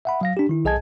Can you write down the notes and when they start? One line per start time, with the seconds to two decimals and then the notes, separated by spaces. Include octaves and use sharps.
0.05 E5 F#5 B5
0.21 F#3 F5 A#6
0.37 D4 G4
0.49 D#3 E4
0.65 B1 G#4 D#5 G#5 A5 G#6